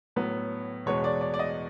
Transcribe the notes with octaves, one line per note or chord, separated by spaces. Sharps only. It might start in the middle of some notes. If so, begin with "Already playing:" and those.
A2 F#3 B3
E2 B2 G#3 B3 C#5
D5
D5
D5
D#5